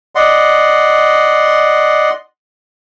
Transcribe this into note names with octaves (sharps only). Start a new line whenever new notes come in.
D5 D#5 F#5 C6